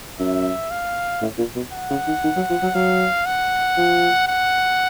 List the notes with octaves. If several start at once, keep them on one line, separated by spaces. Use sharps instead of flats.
F#2 E5
F5
A2
A#2
B2
F#5
C#3
D#3
D#3
F#3
F3
F#3
F#3 F5
F#5
F3
F#5